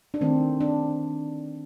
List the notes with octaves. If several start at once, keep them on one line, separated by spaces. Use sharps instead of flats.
D4
D#3 A3 C4
D4